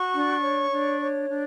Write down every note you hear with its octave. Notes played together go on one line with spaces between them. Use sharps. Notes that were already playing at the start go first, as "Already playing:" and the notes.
Already playing: F#4 C#6
D4
C#5
D4
C#5
D4